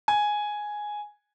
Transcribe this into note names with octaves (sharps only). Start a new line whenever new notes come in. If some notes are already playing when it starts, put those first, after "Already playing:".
G#5